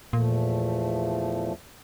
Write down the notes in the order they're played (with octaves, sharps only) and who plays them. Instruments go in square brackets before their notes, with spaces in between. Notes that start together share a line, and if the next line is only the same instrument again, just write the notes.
[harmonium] E2 F3 A3 [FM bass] A#2